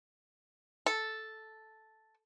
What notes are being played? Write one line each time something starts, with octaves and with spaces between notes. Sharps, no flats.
A4